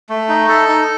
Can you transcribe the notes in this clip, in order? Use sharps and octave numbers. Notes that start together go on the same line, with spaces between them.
A3
D#4
A4
D#4